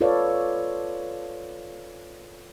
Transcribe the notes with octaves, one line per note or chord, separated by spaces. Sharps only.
F4 A4 B4 C#5 D5 F5